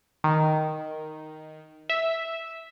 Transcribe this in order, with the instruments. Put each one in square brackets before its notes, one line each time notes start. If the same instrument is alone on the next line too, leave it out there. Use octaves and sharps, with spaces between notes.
[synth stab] D#3
E5